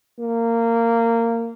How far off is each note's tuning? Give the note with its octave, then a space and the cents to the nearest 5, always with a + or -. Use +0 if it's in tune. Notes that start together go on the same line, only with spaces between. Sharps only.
A#3 -15